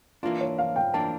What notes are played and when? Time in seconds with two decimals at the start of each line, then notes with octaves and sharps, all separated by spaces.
0.23 E3 A#3 D4 F4
0.41 C#5
0.58 F5
0.76 G5
0.94 E3 A#3 D4 A5